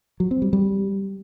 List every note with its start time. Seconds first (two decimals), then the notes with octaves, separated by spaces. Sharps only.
0.20 F#3
0.31 C4
0.42 G3
0.53 G3